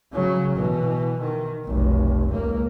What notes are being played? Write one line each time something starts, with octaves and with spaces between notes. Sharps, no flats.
C#3 F#3
B2 E3
D#3
F1 B1
C#2 A#3